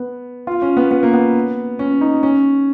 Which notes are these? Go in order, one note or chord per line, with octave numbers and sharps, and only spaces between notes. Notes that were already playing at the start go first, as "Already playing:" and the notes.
Already playing: B3
F4
C#4
B3
B3
A#3
B3
C#4
D#4
C#4